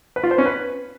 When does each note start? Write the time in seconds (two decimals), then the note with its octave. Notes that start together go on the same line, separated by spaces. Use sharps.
0.16 B4
0.24 F4
0.31 C5
0.38 C#4
0.46 B4